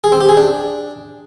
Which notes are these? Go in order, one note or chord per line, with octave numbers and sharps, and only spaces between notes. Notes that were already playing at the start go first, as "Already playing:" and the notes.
G#4
C4
G4
G#4
D4